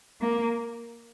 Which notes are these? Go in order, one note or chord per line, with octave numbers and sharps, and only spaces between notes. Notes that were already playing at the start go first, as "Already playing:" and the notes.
A#3